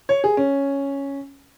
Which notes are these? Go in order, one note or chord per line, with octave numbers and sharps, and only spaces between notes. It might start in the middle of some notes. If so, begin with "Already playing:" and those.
C#5
G#4
C#4